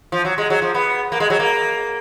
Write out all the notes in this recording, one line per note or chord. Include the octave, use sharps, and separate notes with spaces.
F3
F#3
G#3
F#3
F3
B3
A#3
G#3
F#3
A#3